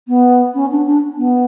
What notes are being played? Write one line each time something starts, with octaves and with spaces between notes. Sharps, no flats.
B3
C#4
D4
D4
B3